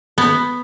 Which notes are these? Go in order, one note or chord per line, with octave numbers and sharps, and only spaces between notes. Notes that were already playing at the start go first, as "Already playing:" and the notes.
B3